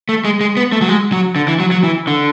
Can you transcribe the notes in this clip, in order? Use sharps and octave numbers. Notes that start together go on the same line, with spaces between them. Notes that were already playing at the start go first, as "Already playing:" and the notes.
A3
G#3
G#3
B3
A3
F#3
G#3
F#3
D3
E3
F#3
F#3
E3
D3